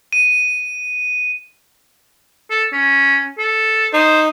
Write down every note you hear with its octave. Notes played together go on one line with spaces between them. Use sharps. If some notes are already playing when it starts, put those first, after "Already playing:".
D#7
A4
C#4
A4
D#4 C5